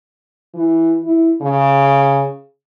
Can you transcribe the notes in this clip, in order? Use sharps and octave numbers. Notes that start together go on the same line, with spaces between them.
E3
E4
C#3